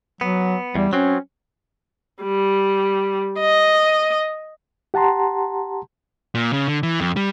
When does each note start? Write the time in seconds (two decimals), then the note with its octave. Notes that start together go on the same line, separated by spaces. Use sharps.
0.21 F#3 B3
0.75 E2 G3
0.93 F#3 C4 C#4
2.23 G3
3.39 D#5
4.94 G4 F#5 A5 A#5 C6
6.35 A#2
6.53 C#3
6.68 D3
6.83 E3
7.00 F2
7.16 G3